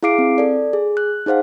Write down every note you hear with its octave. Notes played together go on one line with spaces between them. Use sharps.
E4 G#4 F5 D6 C7 D7
C4
A4 D5
G#4
F#6
D#4 G#4 C5 F5 F#5